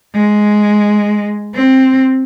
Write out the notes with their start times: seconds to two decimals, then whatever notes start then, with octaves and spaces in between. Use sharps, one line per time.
0.15 G#3
1.55 C4